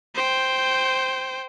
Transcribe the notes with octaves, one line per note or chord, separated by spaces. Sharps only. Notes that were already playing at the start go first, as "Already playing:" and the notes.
C5 G5